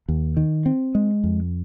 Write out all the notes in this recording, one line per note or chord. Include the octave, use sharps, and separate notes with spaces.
D#2
D#3
C4
G#3
F2